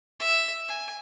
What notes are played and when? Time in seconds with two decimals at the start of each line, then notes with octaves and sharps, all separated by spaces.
0.20 E5
0.68 G#5